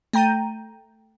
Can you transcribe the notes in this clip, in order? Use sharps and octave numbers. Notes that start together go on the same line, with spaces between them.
A3 G5 A#5 G6 D#7